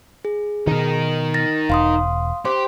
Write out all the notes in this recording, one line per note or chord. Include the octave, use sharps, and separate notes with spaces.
G#4
B2 D#3 D#4 A#4
A6 A#6
E1 F5 C6 D#6
G4 C5 C6